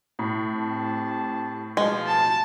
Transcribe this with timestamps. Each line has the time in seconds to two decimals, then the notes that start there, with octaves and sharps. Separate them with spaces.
0.19 A2
0.51 C4 G4 A5
1.77 B2 F3 G#3
2.07 A5